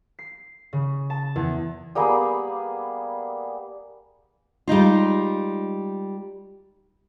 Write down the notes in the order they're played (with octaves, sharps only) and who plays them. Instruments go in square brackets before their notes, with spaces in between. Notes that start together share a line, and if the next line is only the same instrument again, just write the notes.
[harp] C7
C#3
A5
E2
[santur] G3 A#3 B3 G#4
[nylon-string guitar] G3 G#3 D#4 F4